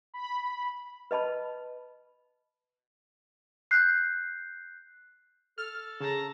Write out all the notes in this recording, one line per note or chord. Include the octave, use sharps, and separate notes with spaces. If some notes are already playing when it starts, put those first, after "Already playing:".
B5
B4 D#5 A5 B5
F#6 G6 C7
A4 F6
C#3 A5 A#5